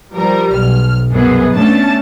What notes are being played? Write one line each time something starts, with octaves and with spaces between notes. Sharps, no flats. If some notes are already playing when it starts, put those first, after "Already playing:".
F3 G3 A#4
B1 F6
C2 F#2 B3 G#4
A3 C#4 D4 A5